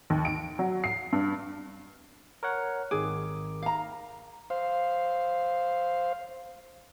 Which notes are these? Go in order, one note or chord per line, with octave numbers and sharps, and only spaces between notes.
D#2
D7
F#3
C7
G2
A#4 C#5 F#5
G#1 D#3 G#4 D6
F5 A#5
C5 F5